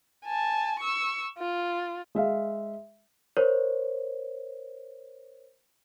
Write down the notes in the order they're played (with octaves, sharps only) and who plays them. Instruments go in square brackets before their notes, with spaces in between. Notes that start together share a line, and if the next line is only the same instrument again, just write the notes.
[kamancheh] G#5 A5
C#6 E6
F4
[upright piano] G#3 E5 F5
[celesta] A#4 C5 C#5